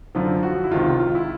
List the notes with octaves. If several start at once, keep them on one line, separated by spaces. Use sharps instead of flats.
F#2 D3 F3 F4
F#4
E4
C#2 C3 D#3 F4
F4
E4